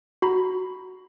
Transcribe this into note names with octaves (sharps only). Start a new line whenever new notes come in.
F#4 A#5 B5